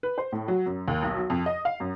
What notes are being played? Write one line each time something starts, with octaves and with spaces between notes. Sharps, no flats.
B4
C5
A2
F#3
F#2
D#2
B1
F#3
F2
D#5
F5
F#2